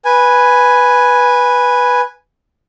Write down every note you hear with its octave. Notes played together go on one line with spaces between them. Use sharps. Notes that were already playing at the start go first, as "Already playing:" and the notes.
B4 G#5